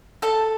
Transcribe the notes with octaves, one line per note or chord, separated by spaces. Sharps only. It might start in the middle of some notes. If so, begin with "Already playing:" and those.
A4 A5